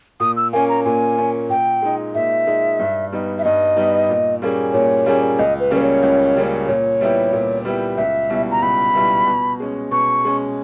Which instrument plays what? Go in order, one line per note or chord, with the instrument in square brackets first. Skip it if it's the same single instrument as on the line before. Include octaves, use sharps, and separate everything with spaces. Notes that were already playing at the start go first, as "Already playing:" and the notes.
[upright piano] A#2 [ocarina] D#6
[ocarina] E6
[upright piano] A#3 C#4 [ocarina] G#5
[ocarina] A#5
[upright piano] A#2 [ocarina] G#5
[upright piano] A#3 C#4
[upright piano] A#2 [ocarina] G5
[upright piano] G#3 D#4
[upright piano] A#2 [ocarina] E5
[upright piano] G#3 D#4
G2
G3 B3 D#4
[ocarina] E5
[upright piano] G2 [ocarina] D#5
[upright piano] G3 B3 D#4
A#2
G3 A#3 C#4 G#4
[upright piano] A#2 [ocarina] C#5
[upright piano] G3 A#3 C#4 G#4
[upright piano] C#2 [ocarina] D#5
[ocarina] B4
[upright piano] C#3 G3 A#3 C#4 [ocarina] B4
[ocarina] C#5
[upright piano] C#2
C#3 G3 A#3 C#4
[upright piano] A#2 [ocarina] C#5
[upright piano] G3 B3 E4 G4
A#2
G3 B3 E4 G4
[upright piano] C#2 [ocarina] E5
[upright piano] B2 G3 B3 E4
[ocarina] A#5
[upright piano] C#2 [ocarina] B5
[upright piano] B2 G3 B3 E4
B2
G#3 C#4
[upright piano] B2 [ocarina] C#6
[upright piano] G#3 C#4